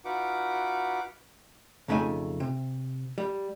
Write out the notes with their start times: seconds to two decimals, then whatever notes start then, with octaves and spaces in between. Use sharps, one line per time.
0.05 D#4 F4 F#4 B4 F#5 D6
1.88 B1 F2 C#3 A3 D#4 G#5
2.40 C3
3.18 G3